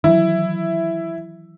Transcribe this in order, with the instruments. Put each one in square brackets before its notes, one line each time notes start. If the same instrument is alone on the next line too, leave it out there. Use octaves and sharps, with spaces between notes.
[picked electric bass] D#3 E3 F#3 [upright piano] E4